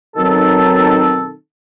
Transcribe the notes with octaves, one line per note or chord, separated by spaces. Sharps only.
B2 D#3 F#3 C4 D#4 A4